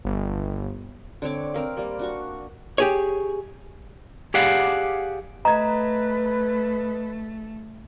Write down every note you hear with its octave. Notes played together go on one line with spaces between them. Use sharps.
G1
D3 C4 C#5 D6
C4 A#4 F5
G3 A#3 D5
D4 F#4 C#6
G4 G#4 C#5
G4 G#4 D5 F5 F#5
A3 B4 D#5 A#5 G#6